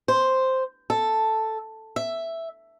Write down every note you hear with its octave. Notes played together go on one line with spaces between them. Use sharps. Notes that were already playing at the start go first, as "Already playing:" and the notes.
C5
A4
E5